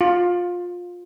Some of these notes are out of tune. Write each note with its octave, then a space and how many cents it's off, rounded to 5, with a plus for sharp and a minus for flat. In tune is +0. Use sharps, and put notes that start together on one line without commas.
F4 +20